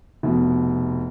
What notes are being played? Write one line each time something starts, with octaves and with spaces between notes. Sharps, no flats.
F1 B2